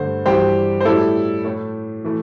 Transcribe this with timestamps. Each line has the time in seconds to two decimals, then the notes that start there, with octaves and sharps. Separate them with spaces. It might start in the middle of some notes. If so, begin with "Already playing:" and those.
Already playing: G2 D3 A3 C5
0.26 G2 E3 G3 G4 C5
0.80 C5
0.85 A2 G3 E4 A4
1.44 A2 A3
2.04 E3 A3